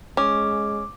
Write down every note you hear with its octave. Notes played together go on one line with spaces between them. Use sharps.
G#3 C#4 D6